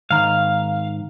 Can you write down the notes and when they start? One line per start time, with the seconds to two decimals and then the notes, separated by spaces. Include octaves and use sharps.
0.11 G#2 D#3 F5 A#5